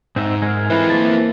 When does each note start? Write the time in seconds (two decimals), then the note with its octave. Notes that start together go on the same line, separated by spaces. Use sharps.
0.16 G#2 C4 D#4 E5
0.42 G#3 A#4
0.70 E3 C4 A4 C5
0.90 A#3 A5